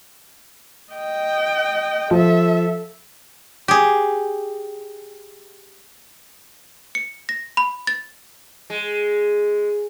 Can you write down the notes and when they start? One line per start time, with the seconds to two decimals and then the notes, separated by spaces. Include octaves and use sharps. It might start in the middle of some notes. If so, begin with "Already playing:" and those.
0.93 D#5 G5
2.11 F3 A4 E5
3.68 G4 G#4
6.95 C#7
7.29 A#6
7.57 B5
7.87 A6
8.70 G#3